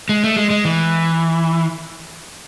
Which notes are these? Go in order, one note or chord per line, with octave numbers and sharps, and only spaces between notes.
G#3
A3
G#3
G#3
E3